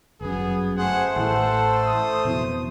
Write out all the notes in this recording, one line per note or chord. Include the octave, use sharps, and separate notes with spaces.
G1 F#2 B3 G#4
A3 G#4 C5 F#5
A1 A2 E3 A4 F#5
D#6
F1 B2 E3